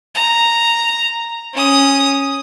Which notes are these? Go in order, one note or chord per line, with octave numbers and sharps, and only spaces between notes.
A#5
C#4 D#6